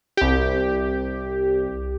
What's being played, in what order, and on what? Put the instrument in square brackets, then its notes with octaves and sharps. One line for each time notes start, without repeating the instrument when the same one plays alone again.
[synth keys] C2 G4